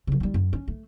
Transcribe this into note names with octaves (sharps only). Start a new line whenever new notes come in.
C#3 F#3
D#3 G3
F#2
C#4
A3